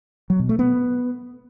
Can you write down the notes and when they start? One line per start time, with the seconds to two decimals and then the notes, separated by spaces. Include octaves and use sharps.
0.30 F#3
0.40 B2
0.49 A3
0.59 B3